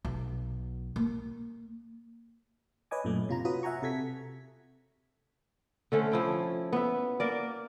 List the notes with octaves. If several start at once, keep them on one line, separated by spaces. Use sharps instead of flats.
B1
A#3
B4 C#5 D#5 G#5 D6
F#2 A#2 A3
C3 F4 A#5
F4 F#4 B4 C#5 B5 D#6
E5 F#5 G#5 A#5 C#6
C3 A4 G#6 B6
D3 A3 C#4 C5
F3 E4 G5
B3 E5
A#3 A#4 D5